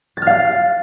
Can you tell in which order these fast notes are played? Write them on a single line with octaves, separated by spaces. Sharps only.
A6 F6 F5